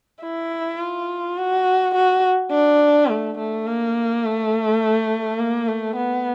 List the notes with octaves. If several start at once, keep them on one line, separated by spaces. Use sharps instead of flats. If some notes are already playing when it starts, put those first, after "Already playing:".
E4
F4
F#4
F#4
D4
A3
A3
A#3
A3
A#3
A3
B3